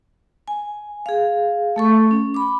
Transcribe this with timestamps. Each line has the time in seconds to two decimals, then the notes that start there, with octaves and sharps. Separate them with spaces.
0.48 G#5
1.06 G#4 F5
1.76 A3 A4 C#6
2.11 C#4
2.34 B5 D6